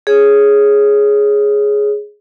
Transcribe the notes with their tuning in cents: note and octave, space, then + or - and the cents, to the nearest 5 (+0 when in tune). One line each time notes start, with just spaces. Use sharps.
G#4 +0 C#5 +0